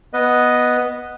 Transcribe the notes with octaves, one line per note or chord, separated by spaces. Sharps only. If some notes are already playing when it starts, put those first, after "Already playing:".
B3 B4 D#5